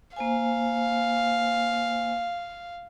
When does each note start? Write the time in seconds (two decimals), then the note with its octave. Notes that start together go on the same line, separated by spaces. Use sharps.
0.16 A#3 C5 F5 G#5